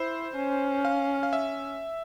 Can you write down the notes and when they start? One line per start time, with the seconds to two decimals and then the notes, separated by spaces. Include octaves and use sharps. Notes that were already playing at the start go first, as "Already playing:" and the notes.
Already playing: E4 C5
0.35 C#4
0.85 F5
1.23 F5
1.33 E5